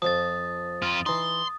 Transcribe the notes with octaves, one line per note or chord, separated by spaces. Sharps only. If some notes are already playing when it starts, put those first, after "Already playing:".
F2 F3 D#6 A6
F2 F4
E3 D#4 C6 D#6